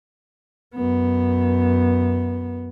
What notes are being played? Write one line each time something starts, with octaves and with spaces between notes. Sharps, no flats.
F#2 B3